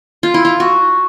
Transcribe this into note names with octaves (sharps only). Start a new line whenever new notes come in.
F4
E4
F4
F#4